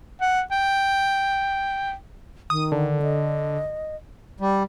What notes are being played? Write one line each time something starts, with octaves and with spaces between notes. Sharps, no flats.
F#5
G5
D#3 D#6
D3
D#5
G3